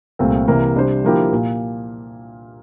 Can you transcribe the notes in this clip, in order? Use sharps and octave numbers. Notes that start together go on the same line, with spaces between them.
C2 A#2 A3 C4
C2 C3 E3 G3 A#3
C3 G3 D4 G4 C5
D3 F3 A#3 E4 G4
A#2